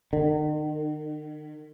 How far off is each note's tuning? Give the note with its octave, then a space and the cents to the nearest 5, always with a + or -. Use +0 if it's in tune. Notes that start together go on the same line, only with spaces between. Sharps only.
D#3 -40